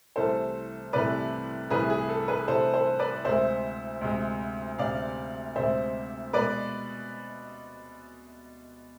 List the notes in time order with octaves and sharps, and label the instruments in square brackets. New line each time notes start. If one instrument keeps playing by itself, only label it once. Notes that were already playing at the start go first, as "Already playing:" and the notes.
[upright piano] C2 C3 E3 A3 A4 C5
C2 C3 E3 A3 B4 D5
C2 C3 E3 A3 G#4 B4
G#4
A4
G#4 B4
C2 C3 E3 A3 A4 C5
A4 C5
B4 D5
D2 C3 G#3 C5 E5
D2 C3 G#3
D2 C3 G#3 D5 F5
D2 C3 G#3 C5 E5
B2 G#3 B4 D5